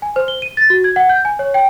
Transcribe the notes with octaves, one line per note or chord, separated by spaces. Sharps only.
G#5
C5
G7
D#7
A6
F#4
G#6
F#5
G6
G#5
C#5
G5